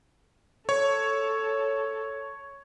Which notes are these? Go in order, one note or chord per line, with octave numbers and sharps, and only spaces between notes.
A4 C#5